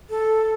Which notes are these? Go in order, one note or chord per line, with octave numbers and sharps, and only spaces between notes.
A4